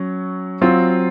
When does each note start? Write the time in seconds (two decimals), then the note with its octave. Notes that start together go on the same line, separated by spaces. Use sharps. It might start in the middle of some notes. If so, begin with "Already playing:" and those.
Already playing: F#3 C#4
0.61 F#3 C4 F4